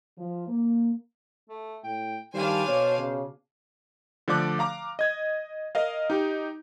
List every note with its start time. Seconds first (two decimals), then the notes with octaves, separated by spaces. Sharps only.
0.18 F3
0.48 A#3
1.49 A3
1.84 A2 G5
2.34 D#3 G3 D4 C5 F5 G#5
2.67 B2 C#5
2.98 C#3
4.28 D3 F3 A3 D5 D6 F#6
4.59 F5 A#5 D6
4.99 D#5 G#6
5.75 A#4 D#5 F5
6.10 D#4 G4